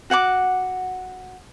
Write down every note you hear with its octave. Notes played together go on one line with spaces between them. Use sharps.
F#4 F#5 G5 D6